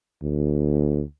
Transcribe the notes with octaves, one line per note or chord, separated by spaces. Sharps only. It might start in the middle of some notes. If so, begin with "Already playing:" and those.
D2